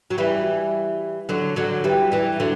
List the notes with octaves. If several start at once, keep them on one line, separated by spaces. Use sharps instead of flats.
F#3
E3 G3
D3 F#3
D3 F#3
E3 G3
E3 G3
D3 F#3